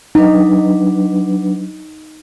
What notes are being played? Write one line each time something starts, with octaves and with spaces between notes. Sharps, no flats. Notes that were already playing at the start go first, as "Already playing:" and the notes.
F#3 D4 D#4 B4